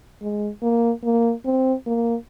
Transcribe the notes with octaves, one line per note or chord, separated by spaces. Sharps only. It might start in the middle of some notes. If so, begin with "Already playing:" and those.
G#3
A#3
A#3
C4
A#3